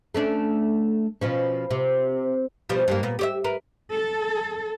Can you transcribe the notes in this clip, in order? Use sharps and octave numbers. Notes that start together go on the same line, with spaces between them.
A3 C#4 D4
B2 F3 C#4
C3
B2 F3 G3
G2 G3 A#3
A#2 B3
G4 C#5 E5
A#4 B4
A4